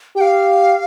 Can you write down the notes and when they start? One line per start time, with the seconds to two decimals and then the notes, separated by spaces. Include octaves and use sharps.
0.16 G4 F5 G5